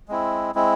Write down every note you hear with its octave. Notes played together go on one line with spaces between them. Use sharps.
G#3 C4 E4
G#3 C4 E4